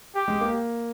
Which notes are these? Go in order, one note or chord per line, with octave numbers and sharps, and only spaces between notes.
G4
G#3
A#3